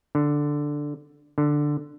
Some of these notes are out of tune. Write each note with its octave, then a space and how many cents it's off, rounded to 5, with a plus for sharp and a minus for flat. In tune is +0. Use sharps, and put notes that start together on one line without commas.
D3 +0
D3 +5